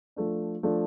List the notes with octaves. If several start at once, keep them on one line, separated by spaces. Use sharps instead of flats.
F3 A3 D4
F3 A3 D4